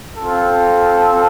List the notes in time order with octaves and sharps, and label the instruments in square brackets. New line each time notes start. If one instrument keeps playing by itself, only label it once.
[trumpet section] C4 F4 A4